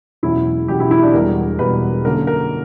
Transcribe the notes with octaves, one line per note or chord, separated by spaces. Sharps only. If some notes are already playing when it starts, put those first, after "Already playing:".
E1 E2 B2 F#3 C#4 E4
E1 E2 B2 F#3 C#4 G4
E4
E4
D4
E1 E2 B2 G3 A#4
E1 E2 B2 G3 B4
F#2 D3 A#3 C#4 A#4
A#4